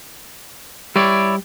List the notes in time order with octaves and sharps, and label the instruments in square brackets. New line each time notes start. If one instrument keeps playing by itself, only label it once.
[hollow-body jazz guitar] G3 [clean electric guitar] E4 C#5 D5